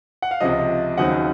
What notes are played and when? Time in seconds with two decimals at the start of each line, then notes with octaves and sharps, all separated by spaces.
0.22 F#5
0.31 F5
0.40 C#2 C3 F3 D#5
0.98 D#2 C#3 F#3 C4 D#4 F#5